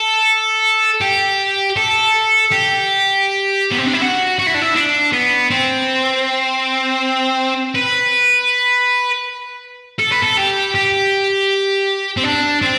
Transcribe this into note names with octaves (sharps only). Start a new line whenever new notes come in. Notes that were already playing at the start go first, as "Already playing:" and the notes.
Already playing: A4
G4
A4
G4
B3
C4
D4
E4
F#4
F#4
E4
D4
E4
D4
B3
C4
B4
A4
B4
A4
G4
G4
C4
D4
C4